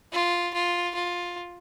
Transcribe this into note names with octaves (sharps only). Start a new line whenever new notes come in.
F4
F4
F4